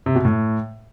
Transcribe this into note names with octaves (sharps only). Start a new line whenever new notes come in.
C3
B2
A2